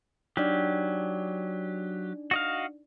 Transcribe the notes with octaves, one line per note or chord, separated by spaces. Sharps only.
F#3 D4 D#4 G4 D5
F#4 D#5 F5